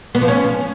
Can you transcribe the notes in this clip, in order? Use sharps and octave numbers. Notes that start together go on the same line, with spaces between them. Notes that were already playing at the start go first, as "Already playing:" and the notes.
B3
F3
C#4